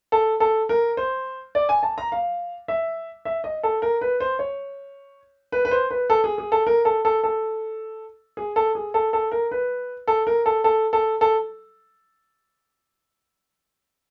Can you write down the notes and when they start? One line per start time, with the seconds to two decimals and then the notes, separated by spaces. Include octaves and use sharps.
0.12 A4
0.40 A4
0.69 A#4
0.97 C5
1.55 D5
1.69 G#5
1.83 A5
1.98 A#5
2.12 F5
2.68 E5
3.25 E5
3.44 D#5
3.63 A4
3.82 A#4
4.01 B4
4.20 C5
4.39 C#5
5.52 B4
5.65 B4
5.71 C5
5.90 B4
6.10 A4
6.24 G#4
6.38 G#4
6.52 A4
6.67 A#4
6.85 A4
7.05 A4
7.24 A4
8.37 G#4
8.56 A4
8.75 G#4
8.94 A4
9.13 A4
9.32 A#4
9.51 B4
10.08 A4
10.27 A#4
10.46 A4
10.64 A4
10.93 A4
11.21 A4